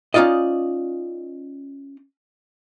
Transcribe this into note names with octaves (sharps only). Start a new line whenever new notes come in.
C#4 D#4 F4 D5 D#5